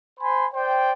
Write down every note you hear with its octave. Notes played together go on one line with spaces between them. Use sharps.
C5 G#5 B5 C6
C5 D5 G5